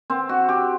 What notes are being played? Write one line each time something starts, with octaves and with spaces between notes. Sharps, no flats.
C4
F#4
G4